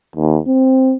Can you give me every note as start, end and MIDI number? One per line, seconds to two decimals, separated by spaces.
0.16 0.39 39
0.47 0.95 60